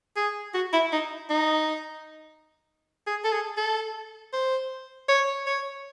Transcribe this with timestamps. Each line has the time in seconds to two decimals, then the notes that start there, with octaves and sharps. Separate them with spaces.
0.16 G#4
0.54 F#4
0.73 E4
0.92 D#4
1.30 D#4
3.07 G#4
3.25 A4
3.32 G#4
3.57 A4
4.33 C5
5.09 C#5
5.47 C#5